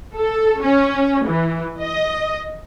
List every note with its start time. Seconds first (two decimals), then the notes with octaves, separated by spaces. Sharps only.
0.15 A4
0.61 C#4
1.26 E3
1.80 D#5